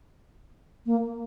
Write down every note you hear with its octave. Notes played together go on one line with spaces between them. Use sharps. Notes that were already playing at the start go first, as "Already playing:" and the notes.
A#3